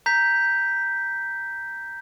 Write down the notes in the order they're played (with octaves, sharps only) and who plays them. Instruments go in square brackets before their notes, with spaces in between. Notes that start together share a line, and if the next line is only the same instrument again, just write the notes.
[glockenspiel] A#5 G6 B6